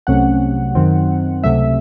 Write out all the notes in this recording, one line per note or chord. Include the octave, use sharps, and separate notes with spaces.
C2 C3 F#3 A3 C#4 F#5
F#2 D#3 F#3 C4
C#2 C3 F#3 A3 E5